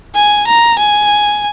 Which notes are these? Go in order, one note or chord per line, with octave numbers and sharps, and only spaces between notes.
G#5
A#5
G#5